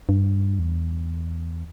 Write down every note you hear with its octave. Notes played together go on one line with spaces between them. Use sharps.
G2
E2